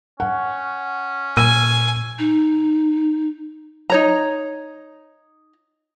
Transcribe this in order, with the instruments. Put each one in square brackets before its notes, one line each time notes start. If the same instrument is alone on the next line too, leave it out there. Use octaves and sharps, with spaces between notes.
[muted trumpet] C#4 [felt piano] F#5
[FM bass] A#2 [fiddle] G#5 [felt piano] E6 D#7
[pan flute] D#4
[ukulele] D#4 C#5 A#5